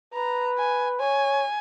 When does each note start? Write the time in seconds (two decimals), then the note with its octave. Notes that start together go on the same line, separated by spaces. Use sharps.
0.14 B4 A#5
0.58 G#5
1.00 C#5 G#5